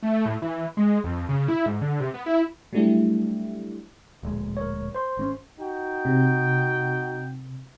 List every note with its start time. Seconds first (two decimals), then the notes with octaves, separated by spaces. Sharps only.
0.03 A3
0.26 A2
0.42 E3
0.77 G#3
1.04 F2
1.29 C#3
1.48 E4
1.66 G#2
1.81 D3
2.00 C3
2.14 B3
2.26 E4
2.73 F#3 G3 A3 D4 E4 G4
4.23 D1 A#1 G#3
4.57 A#4 C#5
4.95 C5 C6
5.17 G#1 C4 C#4
5.58 D#4 F#4 G5
6.05 C3